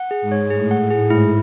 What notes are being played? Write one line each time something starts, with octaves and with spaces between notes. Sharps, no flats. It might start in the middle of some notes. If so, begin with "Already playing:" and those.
Already playing: F#5
G#4
G#2
C#5
A2 G#4
F#5
A2
G#4
G#2 E4